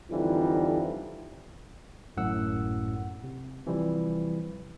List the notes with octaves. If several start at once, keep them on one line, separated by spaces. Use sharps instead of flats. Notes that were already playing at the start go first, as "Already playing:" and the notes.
F2 D3 E3 F3 G3 D#4
G#1 F#2 A2 F#5 E6
C3
C3 E3 F3 G3